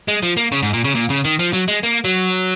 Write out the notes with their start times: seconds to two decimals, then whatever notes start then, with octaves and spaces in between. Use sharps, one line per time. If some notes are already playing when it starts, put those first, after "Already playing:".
0.08 G#3
0.23 F3
0.37 A#3
0.52 C#3
0.63 G#2
0.73 A#2
0.84 C#3
0.95 A#2
1.10 C#3
1.25 D#3
1.39 F3
1.53 F#3
1.68 G#3
1.83 A#3
2.05 F#3